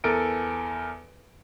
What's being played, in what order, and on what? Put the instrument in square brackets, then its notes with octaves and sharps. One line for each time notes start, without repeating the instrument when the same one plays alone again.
[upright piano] E2 A4 A#4 G#5 D7